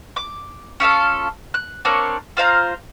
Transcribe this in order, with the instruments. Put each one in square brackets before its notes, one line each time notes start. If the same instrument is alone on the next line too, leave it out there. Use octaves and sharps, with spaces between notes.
[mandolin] D6
C#4 F4 A4 F5
F#6
A#3 C4 D4 C#5
F4 C5 F5 A#5